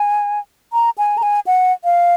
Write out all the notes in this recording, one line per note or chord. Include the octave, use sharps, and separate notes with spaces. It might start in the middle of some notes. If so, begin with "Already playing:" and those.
Already playing: G#5
A#5
G#5
A#5
G#5
F#5
F5